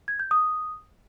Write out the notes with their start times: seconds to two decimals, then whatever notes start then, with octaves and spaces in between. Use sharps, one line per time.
0.08 G#6
0.19 G6
0.31 D#6